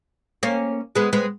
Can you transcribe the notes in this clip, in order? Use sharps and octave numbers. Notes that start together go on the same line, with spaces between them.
A#3 C#4
G#3 B3
G#3 B3